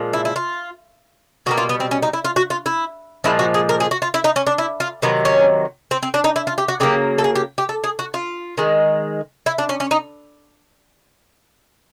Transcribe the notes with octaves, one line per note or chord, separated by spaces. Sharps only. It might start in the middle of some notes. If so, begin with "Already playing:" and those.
Already playing: A#2 F3 G#3
E4
E4
F4
B2 G3 A#3 F#4
F4
B3
C4
C#4
D#4
E4
F4
F#4
F4
E4
A#2 F3 G#3 E4
F#4
G#4
A#4
G#4
F#4
F4
E4
D#4
C#4
D4
E4
F4
C3 D#3 F#3 B3
C#4
C4
C4
D4
D#4
E4
F4
G4
F#4
C#3 F#3 A#3 G4
A4
G#4
G4
G4
A4
G#4
F#4
F4
D#3 G#3
E4
D4
C#4
C#4
D#4